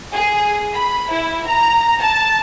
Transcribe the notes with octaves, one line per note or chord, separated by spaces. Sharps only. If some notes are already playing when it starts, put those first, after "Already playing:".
G#4
B5
E4
A#5
A5